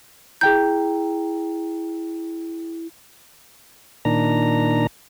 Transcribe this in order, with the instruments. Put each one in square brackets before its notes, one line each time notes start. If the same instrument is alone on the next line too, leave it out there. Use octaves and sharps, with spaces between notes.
[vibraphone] E4 [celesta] G#4 G5 A#5 [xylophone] G6
[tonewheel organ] A#2 D#3 D4 A#5